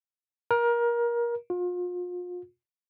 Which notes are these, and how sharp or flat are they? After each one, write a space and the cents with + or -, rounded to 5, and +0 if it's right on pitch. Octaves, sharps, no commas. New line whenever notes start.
A#4 +25
F4 +35